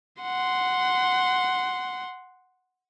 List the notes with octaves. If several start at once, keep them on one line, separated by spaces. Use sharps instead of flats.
F#5 C6